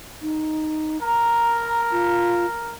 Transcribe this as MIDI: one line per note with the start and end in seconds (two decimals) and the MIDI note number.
0.22 1.01 63
1.02 2.75 70
1.02 1.81 82
1.91 2.46 65